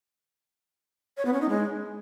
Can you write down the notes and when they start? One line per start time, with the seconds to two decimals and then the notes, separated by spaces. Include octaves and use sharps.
1.17 C#5
1.25 B3
1.33 C#4
1.41 D#4
1.49 G#3